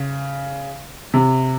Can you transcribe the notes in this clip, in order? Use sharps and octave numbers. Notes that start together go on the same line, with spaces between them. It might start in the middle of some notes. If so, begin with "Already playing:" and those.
Already playing: C#3
C3